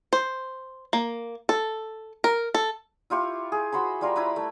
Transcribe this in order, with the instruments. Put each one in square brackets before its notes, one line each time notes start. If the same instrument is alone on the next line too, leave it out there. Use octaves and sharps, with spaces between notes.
[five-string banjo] C5
A#3
A4
A#4
A4
[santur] E4 F4 G4 C#6
G#4
F#4 C5 B5 C6
G3 F4 A#4
E4 A#4 B4 B5
A3